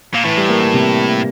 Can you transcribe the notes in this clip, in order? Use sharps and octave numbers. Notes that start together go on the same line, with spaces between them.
A#2
A2 E3
G3
A#3
A#3
C3